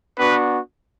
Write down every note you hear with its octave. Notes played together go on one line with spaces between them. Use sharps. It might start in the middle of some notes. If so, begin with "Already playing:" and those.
B3 D4 F#4 B4